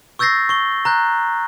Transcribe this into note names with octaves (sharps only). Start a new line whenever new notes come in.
C#6 E6 G6 A6 A#6 C7
C#6 G7
A#5 F#6 G6